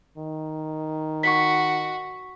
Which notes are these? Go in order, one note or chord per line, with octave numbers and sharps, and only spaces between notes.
D#3
F#4 C#6 B6